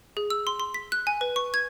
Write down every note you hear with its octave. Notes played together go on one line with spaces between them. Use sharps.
G#4
E6
C6
C6
B6
F#6
G#5
B4
C#6
G#6